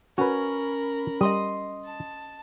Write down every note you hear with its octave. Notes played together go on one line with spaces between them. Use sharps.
C#4 F#4 A#4 B4 B5
G3 D#5 C6 D#6
A5